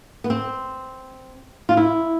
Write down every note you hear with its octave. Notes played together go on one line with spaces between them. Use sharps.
B3
C4
F4
E4